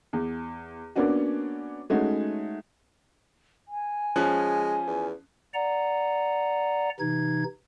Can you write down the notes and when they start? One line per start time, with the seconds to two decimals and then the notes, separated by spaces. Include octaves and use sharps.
0.13 E2
0.96 A#3 B3 C#4 D4 F#4
1.90 G#3 A3 C#4 D#4 F#4
3.68 G#5
4.16 F3 G#3 C#4 F#6
4.87 E2
5.54 D5 F#5 A#5
7.00 C3 E3 D#4 G#6